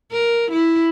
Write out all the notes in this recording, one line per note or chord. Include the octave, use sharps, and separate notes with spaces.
A#4
E4